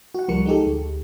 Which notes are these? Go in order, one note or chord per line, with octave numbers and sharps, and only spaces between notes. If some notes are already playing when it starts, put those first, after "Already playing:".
F#4 F#5
C#2 F3 G3 A#4 C#6 C#7
G#3 D#4 G4 A4
D2